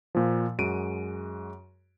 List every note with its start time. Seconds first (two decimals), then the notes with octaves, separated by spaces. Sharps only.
0.15 A#2 F3
0.58 F#2 G#3 F#4 D7 D#7